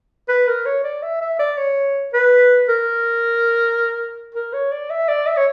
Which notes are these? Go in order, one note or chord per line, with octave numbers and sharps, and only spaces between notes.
B4
A#4
C#5
D5
E5
E5
D5
C#5
B4
A#4
A#4
C#5
D5
E5
D5
E5
C#5